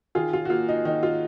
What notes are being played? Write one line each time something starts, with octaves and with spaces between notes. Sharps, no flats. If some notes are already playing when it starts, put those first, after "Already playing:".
D#3 F4 G#4
F4
F#4
A#3 F4
D#4
D#3 D#4
F4